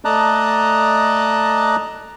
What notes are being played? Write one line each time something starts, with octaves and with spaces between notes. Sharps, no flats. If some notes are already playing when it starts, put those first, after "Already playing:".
A3 D5 D#5 A5 A#5 F#6